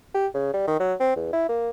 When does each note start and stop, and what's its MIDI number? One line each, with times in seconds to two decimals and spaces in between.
0.14 0.27 67
0.34 0.49 49
0.54 0.63 55
0.67 0.76 51
0.80 0.94 54
1.00 1.15 60
1.16 1.31 40
1.33 1.45 64
1.49 1.70 58